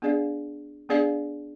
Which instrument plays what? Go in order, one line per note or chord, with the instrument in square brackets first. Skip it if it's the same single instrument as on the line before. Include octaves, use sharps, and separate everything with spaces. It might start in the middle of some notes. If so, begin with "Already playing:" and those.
[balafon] B3 D4 G#4 D5 F5
B3 D4 G#4 D5 F5